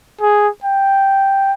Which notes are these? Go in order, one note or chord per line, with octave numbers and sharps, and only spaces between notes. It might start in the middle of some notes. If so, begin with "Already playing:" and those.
G#4
G5